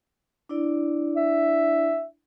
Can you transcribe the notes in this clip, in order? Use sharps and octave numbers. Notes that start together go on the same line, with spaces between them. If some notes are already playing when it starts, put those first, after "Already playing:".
D4 E4 D5
E5